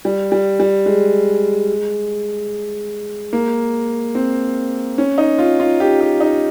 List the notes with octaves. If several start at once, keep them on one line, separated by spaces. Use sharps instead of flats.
G3
G3
G3
G#3
A#3
C4
C#4
D#4
F4
F4
G4
G4
D#4